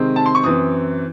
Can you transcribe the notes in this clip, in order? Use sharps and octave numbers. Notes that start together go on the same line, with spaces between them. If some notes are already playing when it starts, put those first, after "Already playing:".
Already playing: C3 D#3 G#3 C4
A5
C6
C#6
F#2 E3 C4 D#6